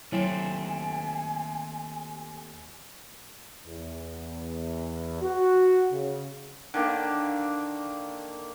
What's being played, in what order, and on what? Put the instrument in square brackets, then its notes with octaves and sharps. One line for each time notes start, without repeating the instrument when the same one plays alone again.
[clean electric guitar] D#2 A3 C4 [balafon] F#3 E4 C#5 [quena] G#5
[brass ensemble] E2
F#4
C#3
[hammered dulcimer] D3 D#3 A#3